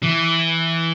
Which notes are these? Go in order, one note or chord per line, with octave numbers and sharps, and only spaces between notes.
E3